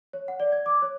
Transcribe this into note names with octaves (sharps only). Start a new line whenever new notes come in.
C#5
F#5
D5
G#6
D6
C#5